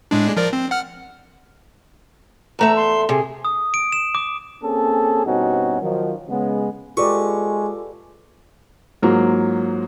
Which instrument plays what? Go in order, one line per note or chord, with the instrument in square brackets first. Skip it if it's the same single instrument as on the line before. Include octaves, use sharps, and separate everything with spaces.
[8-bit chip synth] A2 G#3 D4
F3 A#4 D5
C4
F#5 F6
[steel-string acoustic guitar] E2 A3 E5 [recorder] A#5
[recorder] C6
[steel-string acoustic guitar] C3 [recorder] G#4
[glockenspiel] D#6
D7
E7
D6
[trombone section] A#3 C4 C#4 G#4 A4
G2 B2 C4 C#4 D#4 F#4
D#3 F3 F#3
C#3 G#3 B3
[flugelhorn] G#3 [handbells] F4 A4 D6 [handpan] G4 B4 D5 [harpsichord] C#6
[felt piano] G#2 F#3 A#3 F4